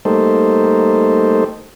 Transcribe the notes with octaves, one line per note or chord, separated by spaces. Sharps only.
G3 A3 A#3 D#4 A4 C5